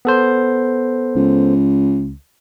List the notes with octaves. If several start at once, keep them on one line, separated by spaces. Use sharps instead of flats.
B3 A4 C5
C#2